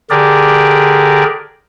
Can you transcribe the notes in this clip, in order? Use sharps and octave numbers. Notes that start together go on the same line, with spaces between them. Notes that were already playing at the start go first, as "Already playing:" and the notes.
D3 G4 G#4 A#4 D5